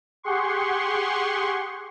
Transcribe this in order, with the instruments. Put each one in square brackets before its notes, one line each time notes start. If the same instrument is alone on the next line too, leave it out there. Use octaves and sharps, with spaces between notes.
[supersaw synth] G4 G#4 F#5 C6 C#6